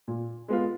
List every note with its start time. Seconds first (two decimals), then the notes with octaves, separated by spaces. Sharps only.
0.08 A#2
0.48 G#3 B3 F4